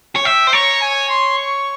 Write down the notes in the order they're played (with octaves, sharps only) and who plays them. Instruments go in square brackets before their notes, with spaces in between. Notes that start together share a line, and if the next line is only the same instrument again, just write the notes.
[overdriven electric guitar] C#5
[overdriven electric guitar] E5 [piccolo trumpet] G5
[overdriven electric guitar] C5
[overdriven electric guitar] C#5 [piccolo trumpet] A#5
[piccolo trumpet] G#5
C6
C#6